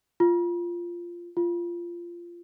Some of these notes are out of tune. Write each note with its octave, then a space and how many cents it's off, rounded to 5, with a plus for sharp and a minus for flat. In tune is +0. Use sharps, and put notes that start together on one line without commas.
F4 -10
F4 -15